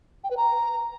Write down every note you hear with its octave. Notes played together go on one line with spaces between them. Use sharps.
G5
B4
A#5